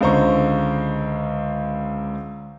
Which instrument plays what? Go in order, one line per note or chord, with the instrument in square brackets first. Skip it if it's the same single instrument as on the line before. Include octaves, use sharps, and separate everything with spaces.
[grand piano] C#2 D3 C5 A#5 C#6